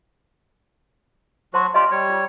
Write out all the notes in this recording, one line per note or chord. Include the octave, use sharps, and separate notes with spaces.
F#3 F#4 C5 A5 C6
F4 G4 D5 D#5 C6
G3 C#5
F4